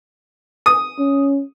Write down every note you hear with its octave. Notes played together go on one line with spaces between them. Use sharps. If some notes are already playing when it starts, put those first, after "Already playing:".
D#6
C#4